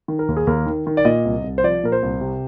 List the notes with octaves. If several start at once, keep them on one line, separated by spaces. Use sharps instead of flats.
D#3
A#4
D#2
G#4
D#2 A#4
D#3
D#3
D5
A#2 D#5
C2
C2
C5
F3 D5
A#2 A#4
C5
C2
C3